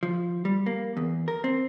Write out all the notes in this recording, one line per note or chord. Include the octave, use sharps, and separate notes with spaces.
F3
G3
A#3
E2
A#4
C4